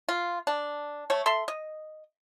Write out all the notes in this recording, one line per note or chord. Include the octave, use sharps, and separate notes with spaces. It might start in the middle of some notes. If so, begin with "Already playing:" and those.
F4
D4
A3 C#5
A4 E5 C6
D#5